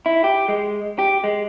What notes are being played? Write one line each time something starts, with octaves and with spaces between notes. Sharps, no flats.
E4
G4
G#3
G4
G#3